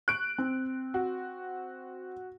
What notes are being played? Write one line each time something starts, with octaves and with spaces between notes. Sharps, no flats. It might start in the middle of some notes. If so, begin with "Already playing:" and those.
C#6 F#6 D7
C4
F#4